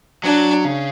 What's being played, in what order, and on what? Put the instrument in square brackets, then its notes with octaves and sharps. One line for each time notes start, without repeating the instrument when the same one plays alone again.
[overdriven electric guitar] F#3 [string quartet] D4
[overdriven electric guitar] C#3